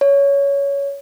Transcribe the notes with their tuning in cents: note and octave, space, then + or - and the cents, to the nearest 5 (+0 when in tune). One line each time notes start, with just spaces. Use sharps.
C#5 +15